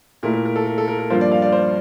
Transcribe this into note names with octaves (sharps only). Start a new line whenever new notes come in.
A#2 A3 E4 A#4
A#4
A#4
A4
A#4
A4
A#4
A#4
G2 F3 A#3 F4 C5
D5
F5
D5
C5